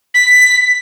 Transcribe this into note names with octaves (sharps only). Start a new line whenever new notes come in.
B6